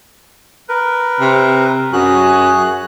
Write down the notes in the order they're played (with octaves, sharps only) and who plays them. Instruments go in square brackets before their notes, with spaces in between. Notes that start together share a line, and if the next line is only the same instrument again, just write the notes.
[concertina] A#4 B4
[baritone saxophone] C3
[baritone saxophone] F#2 [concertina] F#4 [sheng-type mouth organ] G#4 F#6